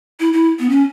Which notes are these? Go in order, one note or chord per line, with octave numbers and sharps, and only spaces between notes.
E4
E4
B3
C#4